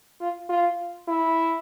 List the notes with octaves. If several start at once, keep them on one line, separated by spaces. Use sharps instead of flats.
F4
F4
E4